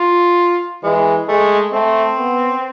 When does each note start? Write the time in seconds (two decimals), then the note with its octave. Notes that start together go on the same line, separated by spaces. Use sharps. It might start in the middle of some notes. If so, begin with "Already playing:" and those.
Already playing: F4
0.83 E3 G#3
1.28 G#3 A3
1.73 A3 C4
2.18 B3